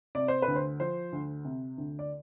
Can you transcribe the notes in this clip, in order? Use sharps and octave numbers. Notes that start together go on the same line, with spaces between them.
C3 D5
C5
B4
D2
C5
F3 C5
D2
C3
D2
D5